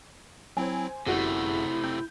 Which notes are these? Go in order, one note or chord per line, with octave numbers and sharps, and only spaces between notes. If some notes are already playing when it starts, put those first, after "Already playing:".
F#3 C4 E4 C5 G#5
G1 F#2 C3 G3 A3 E4 F#4 G#4
C4 G6